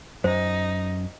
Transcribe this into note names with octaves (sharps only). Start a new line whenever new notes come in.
F#2 D#4 C5